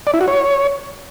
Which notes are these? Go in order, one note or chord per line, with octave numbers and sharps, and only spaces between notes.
D5
E4
F#4
C#5